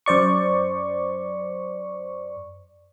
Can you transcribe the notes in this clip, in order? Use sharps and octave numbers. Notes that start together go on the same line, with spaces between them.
F#2 C5 D5 C#6